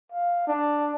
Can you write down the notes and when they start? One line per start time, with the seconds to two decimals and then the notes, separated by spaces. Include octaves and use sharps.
0.12 F5
0.47 D4